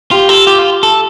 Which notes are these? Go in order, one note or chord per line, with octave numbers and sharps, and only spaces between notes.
F4 G4
A4
F4 G4
F4
A4